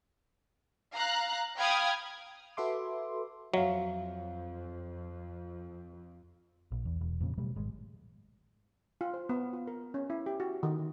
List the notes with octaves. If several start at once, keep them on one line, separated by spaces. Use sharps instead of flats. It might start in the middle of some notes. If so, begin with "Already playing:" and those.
F5 A#5 F#6
F5 G5 B5 D#6 F6 G#6
F#4 A4 B4 E5 C6 D6
F2 F#3 E5 F5
A#1
E2
E1
F2 A#2 C#3
B2 F#3 G3 A3
G#1 G#3
F4
C5
B3
F4
A#4
C#4
E4
G4
F#4
D#3